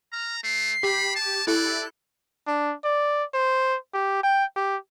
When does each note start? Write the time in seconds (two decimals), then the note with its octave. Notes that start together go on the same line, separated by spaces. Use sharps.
0.12 A#5 F6
0.43 A3 C7
0.83 G4 B5
1.16 A5
1.47 E4 A4 D5 F#6
2.47 D4
2.84 D5
3.34 C5
3.94 G4
4.23 G5
4.56 G4